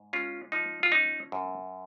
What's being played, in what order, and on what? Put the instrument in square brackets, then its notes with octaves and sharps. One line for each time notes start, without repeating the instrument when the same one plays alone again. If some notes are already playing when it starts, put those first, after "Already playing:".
Already playing: [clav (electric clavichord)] G#2
G#3 C#4 F4
F3 D#4
F4
C#4 D#4
F#2